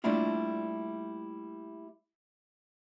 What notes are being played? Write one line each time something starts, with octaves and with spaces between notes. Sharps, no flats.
G3 A3 A#3 D4 E4 F4